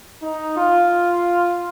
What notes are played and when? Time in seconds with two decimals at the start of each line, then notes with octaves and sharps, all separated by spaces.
0.23 D#4
0.57 F4